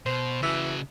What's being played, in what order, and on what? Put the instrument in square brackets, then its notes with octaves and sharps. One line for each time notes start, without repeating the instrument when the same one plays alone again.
[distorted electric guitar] B2 [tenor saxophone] C5
[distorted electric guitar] C#3 F#3 [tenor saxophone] E3